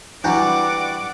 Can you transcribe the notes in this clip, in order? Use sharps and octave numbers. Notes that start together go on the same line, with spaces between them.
E3 G3 D4 E4 F#4 D5 F#5 D6